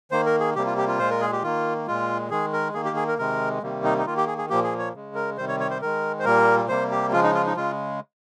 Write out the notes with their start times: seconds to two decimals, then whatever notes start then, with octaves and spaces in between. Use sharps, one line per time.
0.11 D#3 A#3 C5
0.26 A#4
0.40 G#4
0.55 C3 G3 A#3 G4
0.66 F4
0.77 G4
0.87 F4
0.99 A#2 G#3 C5
1.10 A#4
1.20 G#4
1.32 G4
1.43 D#3 A#3 F4
1.87 A#2 G#3 F4
2.30 D#3 G#3 G#4
2.53 A#4
2.74 D#3 A#3 G#4
2.85 G4
2.96 G#4
3.08 A#4
3.18 C3 D#3 G#3 A#4
3.62 C3 D#3 G3 A#3
3.84 D#4
3.98 D#4
4.06 D#3 A#3 F4
4.17 G4
4.27 G#4
4.38 G#4
4.49 A#2 F3 A#3 G4
4.64 G#4
4.78 C#5
4.93 C#3 G#3
5.15 A#4
5.37 C3 D#3 G3 C5
5.48 C#5
5.60 C#5
5.70 C5
5.81 D#3 G#3 A#4
6.19 C5
6.25 A#2 G3 A#3 A#4
6.69 C3 G3 A#3 C5
6.91 G4
7.12 C#3 F3 G#3 F4
7.23 D#4
7.35 F4
7.46 D#4
7.56 C#3 G#3 F4